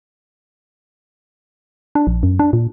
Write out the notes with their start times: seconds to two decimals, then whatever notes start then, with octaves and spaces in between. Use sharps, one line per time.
1.95 D4
2.07 A#1
2.23 F#2
2.39 D4
2.53 A#2